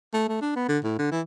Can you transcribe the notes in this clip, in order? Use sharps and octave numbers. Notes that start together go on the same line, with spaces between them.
A3
A3
D4
B3
D3
A2
D3
E3